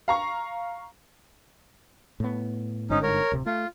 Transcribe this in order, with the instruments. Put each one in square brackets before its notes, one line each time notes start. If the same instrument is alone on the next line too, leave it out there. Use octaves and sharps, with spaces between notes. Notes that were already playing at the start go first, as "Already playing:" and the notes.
[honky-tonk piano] F5 A#5 C#6
[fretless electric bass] A2 B3
[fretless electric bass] G1 G#2 D3 [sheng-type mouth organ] C#4 D#4
[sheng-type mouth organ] A#4 C#5
[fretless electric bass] D1 C3
[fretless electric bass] A3 [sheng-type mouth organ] F4